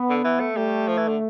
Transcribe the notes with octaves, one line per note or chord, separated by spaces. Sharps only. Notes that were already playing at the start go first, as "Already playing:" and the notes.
Already playing: B3
D3
E3
A3
G3 A3
F3
E3
D3